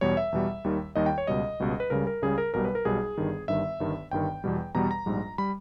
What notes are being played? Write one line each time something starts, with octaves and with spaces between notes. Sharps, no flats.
E2 B2 G3 C#5
E5
E2 B2 G3
D#2 D#3 G3
D#2 D#3 G3 D#5
G5
C#5
C#2 B2 G3 D#5
C#2 B2 G3
B4
C#2 C#3 G3 A#4
A#4
C#2 C#3 G3 G#4
A#4
B1 B2 G3 A#4
B4
A#4
B1 B2 G3 G#4
G1 G2 D#3 G3
G1 G2 D#3 G3 E5
G1 G2 D#3
G1 G2 D#3 G5
E2 B2 G3
E2 B2 G3 A#5
A#5
A#1 G#2 G3
G3 B5